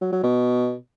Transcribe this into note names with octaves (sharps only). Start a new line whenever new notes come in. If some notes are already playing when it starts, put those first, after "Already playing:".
F#3
F#3
B2